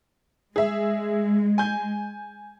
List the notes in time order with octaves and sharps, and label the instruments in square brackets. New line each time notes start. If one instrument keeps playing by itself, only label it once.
[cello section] G#3 [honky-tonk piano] G#4 E5
[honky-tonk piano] G#5 G6